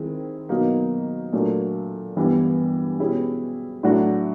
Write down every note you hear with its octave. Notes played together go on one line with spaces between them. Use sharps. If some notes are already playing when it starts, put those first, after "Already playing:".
Already playing: D#3 G#3 C4 E4
B2 F#3 A#3 D#4
A#2 F#3 A3 D4
G2 E3 G3 B3
B2 G#3 C#4 E4 G4
A2 F#3 A3 D4 F#4